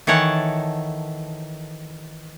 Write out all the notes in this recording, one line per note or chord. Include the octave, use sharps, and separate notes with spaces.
D#3 E3 A4 C#5 F#5 A5